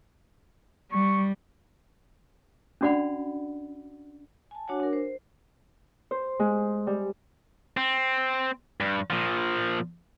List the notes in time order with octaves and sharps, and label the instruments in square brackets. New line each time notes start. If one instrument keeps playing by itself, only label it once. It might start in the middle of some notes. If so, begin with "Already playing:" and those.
[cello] G3 [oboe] C#6
[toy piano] C#4 D4 F#4 D5 F#5 B5
[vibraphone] G#5 A5
D4 F#4 C#5 F#5 G#5
D4 A#4
C5
[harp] C5
G#3
G3
[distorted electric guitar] C4
G2
A#2 F3